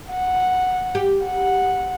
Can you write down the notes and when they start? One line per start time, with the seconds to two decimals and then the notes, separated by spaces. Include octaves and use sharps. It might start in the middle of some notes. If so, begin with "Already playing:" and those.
0.11 F#5
0.95 G4
1.25 F#5